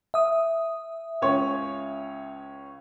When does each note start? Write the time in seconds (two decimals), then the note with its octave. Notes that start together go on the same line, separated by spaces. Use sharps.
0.14 E5 D#6
1.22 C#2 C#4 C#5